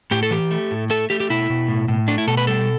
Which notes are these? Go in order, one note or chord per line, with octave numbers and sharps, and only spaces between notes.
A2 G4
A4
E3 G4
A3
A2
A3 A4
A3 G4
G4
B2 E4
B2
A2
A2
A3 D4
E4
B2 A4
B4
G3 A4